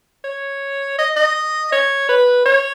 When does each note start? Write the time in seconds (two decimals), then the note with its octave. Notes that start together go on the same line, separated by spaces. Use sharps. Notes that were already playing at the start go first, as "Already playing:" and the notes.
0.24 C#5
0.98 D#5
1.16 D#5
1.72 C#5
2.09 B4
2.45 C#5